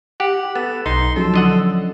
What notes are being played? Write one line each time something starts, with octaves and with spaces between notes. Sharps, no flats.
G4 F#5
B3 A4
B1 D#4 C6
F3 F#3 C#4 A4
D3 D#5 F#5